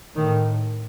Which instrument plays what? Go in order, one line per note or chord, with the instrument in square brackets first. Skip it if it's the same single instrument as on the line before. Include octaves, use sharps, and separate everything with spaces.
[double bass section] A2 D#3